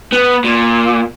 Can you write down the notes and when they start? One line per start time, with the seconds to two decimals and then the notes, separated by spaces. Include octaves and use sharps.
0.12 B3
0.44 A#2